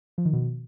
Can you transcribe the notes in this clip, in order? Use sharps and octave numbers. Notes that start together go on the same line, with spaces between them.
F3
D#3
B2